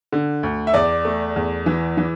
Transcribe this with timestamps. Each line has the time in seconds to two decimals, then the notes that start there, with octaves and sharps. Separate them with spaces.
0.12 D3
0.43 D2
0.67 E5
0.74 E2 D5
1.05 A3
1.36 E2
1.66 E3
1.97 E3